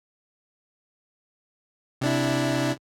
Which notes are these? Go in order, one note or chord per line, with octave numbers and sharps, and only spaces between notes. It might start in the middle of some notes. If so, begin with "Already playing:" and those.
C3 D4 E4